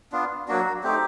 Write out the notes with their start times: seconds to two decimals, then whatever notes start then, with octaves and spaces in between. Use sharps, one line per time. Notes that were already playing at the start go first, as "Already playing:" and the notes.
0.12 B3 D4 F4
0.48 F#3 A#3 D4 F#4
0.83 A3 C4 D#4 G4